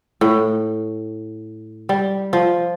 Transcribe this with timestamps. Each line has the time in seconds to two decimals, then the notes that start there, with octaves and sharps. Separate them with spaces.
0.21 A2
1.89 G3
2.33 F3